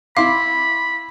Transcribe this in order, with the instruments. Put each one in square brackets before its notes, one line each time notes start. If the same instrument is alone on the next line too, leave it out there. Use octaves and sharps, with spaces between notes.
[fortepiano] E4 C6 D6 [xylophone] F5 [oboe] B5